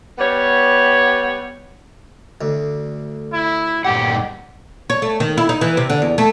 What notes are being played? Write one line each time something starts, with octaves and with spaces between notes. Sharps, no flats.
G3 B3 G4 C#5
D2
E4
G2 A#2 G4 F#5
C#5
A3
D#3
E4
D#4
E3
C3
D3
E2
A3